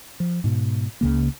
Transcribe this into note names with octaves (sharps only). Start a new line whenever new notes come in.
F3
G#2 B2
C#2 C#3 A#3